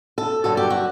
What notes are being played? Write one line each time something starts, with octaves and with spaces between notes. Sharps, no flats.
A4
G2 D3 F#3 A4
G4
F#4